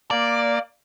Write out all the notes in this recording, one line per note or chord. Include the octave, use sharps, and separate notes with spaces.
A#3 D5